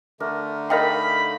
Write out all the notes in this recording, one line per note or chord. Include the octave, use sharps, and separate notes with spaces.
D3 A3 D4 A#4
D#4 A#4 D#5 F5 G5 A#5 B5